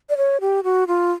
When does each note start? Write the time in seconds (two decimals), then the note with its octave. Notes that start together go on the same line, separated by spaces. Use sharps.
0.10 D5
0.17 C#5
0.41 G4
0.64 F#4
0.87 F4